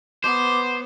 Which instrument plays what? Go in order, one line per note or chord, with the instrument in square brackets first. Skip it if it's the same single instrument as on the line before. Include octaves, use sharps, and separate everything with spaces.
[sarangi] B3 [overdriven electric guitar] C5 [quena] D6